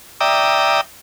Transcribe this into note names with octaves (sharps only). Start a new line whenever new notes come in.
D5 E5 G5 A#5 D#6